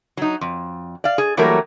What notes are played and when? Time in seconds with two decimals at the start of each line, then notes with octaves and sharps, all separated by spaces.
0.17 F#3 D#4
0.41 F2
1.04 D5 F5
1.18 G#4
1.37 E3 F#3 G3 A3 A#3 A#4